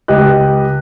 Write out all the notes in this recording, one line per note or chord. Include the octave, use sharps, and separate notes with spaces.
C#2 G4 D#5 F#6